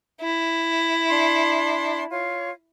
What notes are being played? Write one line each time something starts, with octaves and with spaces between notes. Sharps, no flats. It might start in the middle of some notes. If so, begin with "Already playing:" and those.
E4
D4 C6
F4 C#5